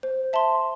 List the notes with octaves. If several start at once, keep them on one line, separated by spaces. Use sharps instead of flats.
C5
E5 A5 C6